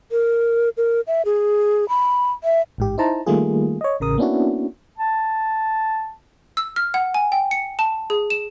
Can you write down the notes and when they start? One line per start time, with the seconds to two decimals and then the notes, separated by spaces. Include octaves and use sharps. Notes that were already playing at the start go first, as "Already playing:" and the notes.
0.12 A#4
0.77 A#4
1.07 E5
1.25 G#4
1.89 B5
2.44 E5
2.78 A1 G#2 G4
2.98 D#4 E4 C5 A5 A#5
3.26 D#3 G3 A3 A#3 F4 G#4
3.81 C#5 D#5
4.00 A1 C#3 A#4 D#6
4.18 A#3 B3 C#4 D4 E4 F#4
4.97 A5
6.57 E6
6.76 F6
6.94 F#5
7.14 G#5
7.32 G5
7.51 C#7
7.79 A5
8.10 G#4
8.30 E7